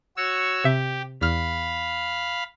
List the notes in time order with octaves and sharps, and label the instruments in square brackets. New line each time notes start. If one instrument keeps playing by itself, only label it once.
[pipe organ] F#4 C#5 E6
[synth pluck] C3 E5 [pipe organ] G4
[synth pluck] E2 F6 [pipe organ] F5 B5